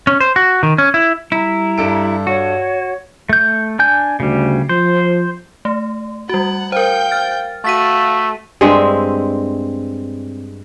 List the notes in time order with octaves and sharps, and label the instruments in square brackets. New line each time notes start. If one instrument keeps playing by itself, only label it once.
[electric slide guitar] C#4
C5
F#4
D#3
C#4
E4
[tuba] G3 [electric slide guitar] E4 [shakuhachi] A#5
[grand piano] G2 A4 D7
[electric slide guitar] F#4 [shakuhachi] C#5
[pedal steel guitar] A3 G6
D4 G#5 G6
[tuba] D2 [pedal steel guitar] C#3 G3
[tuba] F3 [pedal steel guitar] C5
[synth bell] A3
[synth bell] G3 F#4 [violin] F#5
[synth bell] A#4 C5 [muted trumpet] F5 [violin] G5 G6
[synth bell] F6 A6
[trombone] A3 [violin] F#4 [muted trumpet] F5 [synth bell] A6 B6 D#7
[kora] G2 G#3 C4 E5